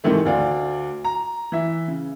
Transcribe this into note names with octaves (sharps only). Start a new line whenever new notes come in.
G#2 C3 D#3 E3 A3
D2 D5 F5
A#5
E3 E5
C#3